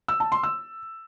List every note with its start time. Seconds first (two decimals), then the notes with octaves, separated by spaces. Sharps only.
0.08 E6
0.20 A5
0.32 C6
0.43 E6